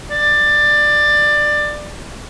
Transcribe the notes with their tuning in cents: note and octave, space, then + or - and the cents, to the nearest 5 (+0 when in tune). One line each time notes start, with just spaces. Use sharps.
D5 +15